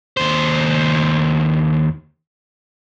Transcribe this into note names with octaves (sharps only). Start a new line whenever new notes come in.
D#2 C5